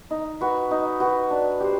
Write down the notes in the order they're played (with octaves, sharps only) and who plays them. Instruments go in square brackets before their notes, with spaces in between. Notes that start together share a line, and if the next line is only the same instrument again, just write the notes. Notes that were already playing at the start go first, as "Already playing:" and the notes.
[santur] D#4
F#4 B4
D#4
F#4 B4
D4
G4 C5